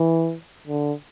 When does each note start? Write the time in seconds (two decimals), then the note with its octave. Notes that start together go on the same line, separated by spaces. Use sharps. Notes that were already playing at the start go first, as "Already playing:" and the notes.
Already playing: E3
0.67 D3